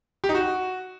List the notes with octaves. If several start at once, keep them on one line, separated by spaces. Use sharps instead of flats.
G4
D#4
F#4